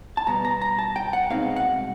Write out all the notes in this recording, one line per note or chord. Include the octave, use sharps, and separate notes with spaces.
A5
B2 G3 B3 A#5
A#5
A#5
A5
G5
F#5
C2 B2 G#3 C4 D#4 F5
F#5